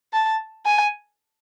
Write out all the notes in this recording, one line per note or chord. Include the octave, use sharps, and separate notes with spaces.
A5
G#5